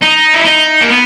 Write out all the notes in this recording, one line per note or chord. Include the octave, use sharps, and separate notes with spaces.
D#4
E4
D#4
A#3
B3